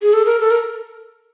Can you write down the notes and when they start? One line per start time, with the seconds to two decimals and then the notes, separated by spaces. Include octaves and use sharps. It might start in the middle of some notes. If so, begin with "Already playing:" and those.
0.02 G#4
0.13 A4
0.25 A#4
0.40 A4
0.50 A#4